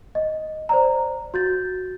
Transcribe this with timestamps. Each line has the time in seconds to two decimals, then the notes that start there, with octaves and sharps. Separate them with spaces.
0.15 D#5
0.69 C5 D5 A#5
1.34 F#4 G6 A6